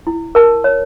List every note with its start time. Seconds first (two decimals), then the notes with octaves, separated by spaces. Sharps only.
0.07 E4
0.35 A#4 A5
0.64 C#5